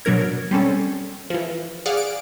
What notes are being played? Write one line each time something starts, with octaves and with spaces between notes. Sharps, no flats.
B2 F#3 D4 A#4 G#6
G3 C4 C#4 A4
E3 F3
G#4 D5 F5 F#5
D7